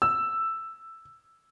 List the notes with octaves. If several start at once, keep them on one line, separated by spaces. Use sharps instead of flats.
E6